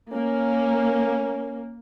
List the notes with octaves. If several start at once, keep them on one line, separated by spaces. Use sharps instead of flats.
A#3 C#4